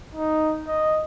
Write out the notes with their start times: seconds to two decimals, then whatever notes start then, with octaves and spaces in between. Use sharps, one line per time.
0.15 D#4
0.68 D#5